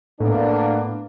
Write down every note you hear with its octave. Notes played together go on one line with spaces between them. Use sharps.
A2 A#3 B3 D4